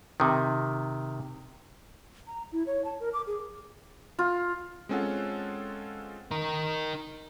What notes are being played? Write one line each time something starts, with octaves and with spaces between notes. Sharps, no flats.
C3 D#3
A#5
E4
C#5
A5
A#4
D6
G#4
F4
G#3 C4 C#4 F4 A4 F#5
D#4 A#4